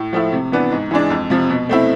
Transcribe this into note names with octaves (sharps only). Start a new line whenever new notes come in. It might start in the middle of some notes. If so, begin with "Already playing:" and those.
Already playing: A2
F3 A3 E4
C3
E3 B3 D4
G#2
E3 G#3 D4
F2
C3 F3
B2
A3 C4 E4